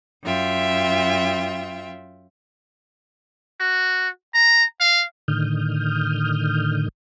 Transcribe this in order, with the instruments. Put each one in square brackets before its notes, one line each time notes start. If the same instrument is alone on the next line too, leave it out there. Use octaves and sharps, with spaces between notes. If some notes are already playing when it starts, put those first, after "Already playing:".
[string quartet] F#2 F4 E5 G5
[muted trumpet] F#4
A#5
F5
[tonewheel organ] A2 D3 D#3 D#6 F6 G6